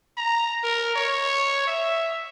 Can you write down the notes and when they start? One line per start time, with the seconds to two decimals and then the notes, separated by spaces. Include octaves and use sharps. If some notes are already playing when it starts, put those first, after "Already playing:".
0.17 A#5
0.63 A#4
0.96 C#5
1.67 E5